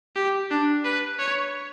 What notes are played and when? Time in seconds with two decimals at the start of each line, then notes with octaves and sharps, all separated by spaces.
0.16 G4
0.51 D4
0.84 B4
1.19 C#5